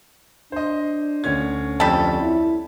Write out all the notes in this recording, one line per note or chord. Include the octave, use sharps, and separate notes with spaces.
D4 C5 D#5
D2 C#4 G#6
F2 G3 A4
E4